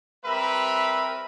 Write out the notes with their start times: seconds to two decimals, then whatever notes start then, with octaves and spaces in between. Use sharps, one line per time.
0.25 G3 C4 A#4 B4 E5 B5